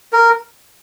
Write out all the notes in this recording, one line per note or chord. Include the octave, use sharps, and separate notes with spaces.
A#4